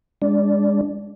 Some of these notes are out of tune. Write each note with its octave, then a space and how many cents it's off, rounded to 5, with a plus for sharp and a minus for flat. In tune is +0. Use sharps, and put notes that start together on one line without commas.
G#3 -25 D4 -30 D5 -10